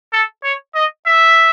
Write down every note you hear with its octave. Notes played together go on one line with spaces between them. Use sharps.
A4
C#5
D#5
E5